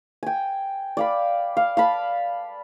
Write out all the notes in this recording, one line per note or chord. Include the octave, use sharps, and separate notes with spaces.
G5 G#5
D5 F5 B5
F5
F5 A5 B5